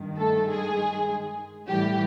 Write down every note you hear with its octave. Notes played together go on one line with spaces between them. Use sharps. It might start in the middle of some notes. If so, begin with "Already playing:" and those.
Already playing: G2 D#3
A3 A4
G#3 G#4
A2 E3 G3 G4